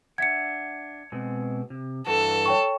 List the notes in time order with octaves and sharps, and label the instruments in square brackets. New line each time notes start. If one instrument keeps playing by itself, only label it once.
[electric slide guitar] D4 E5 F#5 [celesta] G#6 C#7
[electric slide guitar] B2 G#3 C4
C3
[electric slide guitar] G2 E3 F#4 [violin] A4
[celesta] C#5 G5 C#6